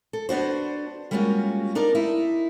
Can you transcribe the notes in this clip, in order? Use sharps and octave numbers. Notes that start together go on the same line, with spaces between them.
A4
B3 D4 F#4 C5
G3 G#3 A#3 C#4 F4 F#4
D4 D#4 A#4 D5
D#4 E4